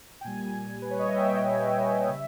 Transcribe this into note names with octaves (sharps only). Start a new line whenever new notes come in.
G5
A#2 G3 G#5
B4
C#5
D#5
E5
G5
C#3 G3 E5